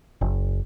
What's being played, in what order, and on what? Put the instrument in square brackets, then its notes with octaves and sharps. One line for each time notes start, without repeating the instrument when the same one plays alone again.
[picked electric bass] F#1